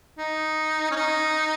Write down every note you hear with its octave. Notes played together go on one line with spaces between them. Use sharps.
D#4
C#4
D#4